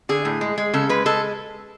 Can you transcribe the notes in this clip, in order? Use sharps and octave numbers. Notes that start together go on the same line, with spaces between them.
D3 G#4
A2
G#3
G#3
C#3 A4
G#3 B4
G#3 A4